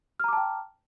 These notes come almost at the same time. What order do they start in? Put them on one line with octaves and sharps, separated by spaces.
F6 A#5 D6 A5 G5